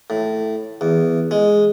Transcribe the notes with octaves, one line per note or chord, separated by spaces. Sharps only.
A2
E2
G#3